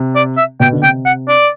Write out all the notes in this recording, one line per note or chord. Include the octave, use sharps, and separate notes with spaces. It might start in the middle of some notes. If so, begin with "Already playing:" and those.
Already playing: C3
D5
E5
B2 G5
D3
C3 G5
F#5
D5